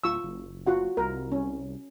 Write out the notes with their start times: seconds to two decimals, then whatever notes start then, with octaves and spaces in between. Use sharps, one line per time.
0.04 D1 F4 C#6 E6
0.23 F#1
0.67 F4 F#4 F#5
0.97 C2 A#4
1.32 C#4